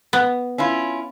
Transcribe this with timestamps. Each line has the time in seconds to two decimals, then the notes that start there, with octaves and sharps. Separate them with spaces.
0.13 B3
0.58 C#4 E4 F4